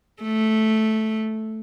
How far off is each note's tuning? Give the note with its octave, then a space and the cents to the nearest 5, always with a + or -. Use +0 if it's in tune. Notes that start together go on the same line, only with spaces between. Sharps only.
A3 -5